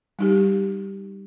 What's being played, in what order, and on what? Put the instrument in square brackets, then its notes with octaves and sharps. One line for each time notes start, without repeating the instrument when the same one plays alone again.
[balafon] G3 D#4 G4